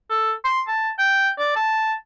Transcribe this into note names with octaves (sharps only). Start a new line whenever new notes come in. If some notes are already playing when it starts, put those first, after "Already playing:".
A4
C6
A5
G5
D5
A5